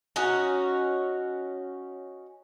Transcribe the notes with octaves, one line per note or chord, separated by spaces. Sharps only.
C#4 D#4 F#4